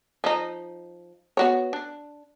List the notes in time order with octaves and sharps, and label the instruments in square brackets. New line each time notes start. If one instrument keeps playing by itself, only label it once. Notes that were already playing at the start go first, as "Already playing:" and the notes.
[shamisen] F3 D#4
B3 F#4 C#5
D4